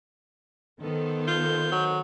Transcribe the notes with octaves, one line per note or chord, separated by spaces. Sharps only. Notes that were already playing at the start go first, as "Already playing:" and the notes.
D#3 B3 A4 C5
F4 G6
F#3